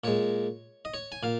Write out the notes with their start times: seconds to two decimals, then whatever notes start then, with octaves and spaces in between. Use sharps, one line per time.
0.04 A#2 G#3 C#5
0.85 D#5
0.94 C#5
1.12 G#5
1.23 A#2 F5